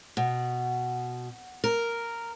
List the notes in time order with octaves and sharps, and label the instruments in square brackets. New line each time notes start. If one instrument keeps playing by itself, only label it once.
[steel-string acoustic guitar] B2
A#4